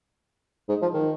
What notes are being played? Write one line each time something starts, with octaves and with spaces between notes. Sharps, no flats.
G#2
F3
D#3